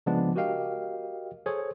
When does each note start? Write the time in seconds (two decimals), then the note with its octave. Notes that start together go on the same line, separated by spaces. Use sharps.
0.06 C#3 F3 G#3 B3 D4
0.36 F#4 G4 A#4 D#5 F5 G5
1.46 G#4 A4 C5 C#5